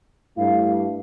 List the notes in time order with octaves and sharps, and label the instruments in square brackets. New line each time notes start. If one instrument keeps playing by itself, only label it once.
[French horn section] G2 A3 E4 [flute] F5